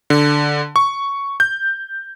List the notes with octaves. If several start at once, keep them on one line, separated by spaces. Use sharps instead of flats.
D3
C#6
G6